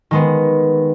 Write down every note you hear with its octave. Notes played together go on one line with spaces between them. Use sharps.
D#3 G#3 B3